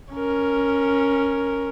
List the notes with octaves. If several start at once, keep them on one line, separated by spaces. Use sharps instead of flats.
C#4 A#4